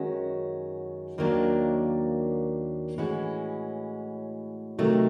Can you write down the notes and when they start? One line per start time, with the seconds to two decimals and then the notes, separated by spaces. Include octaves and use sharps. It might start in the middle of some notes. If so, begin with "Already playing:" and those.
Already playing: F#2 D#3 G#3 C#4 F#4
1.18 D#2 D#3 F#3 A#3 D4
2.98 A2 E3 G#3 C#4 F#4
4.79 C3 D#3 F#3 A3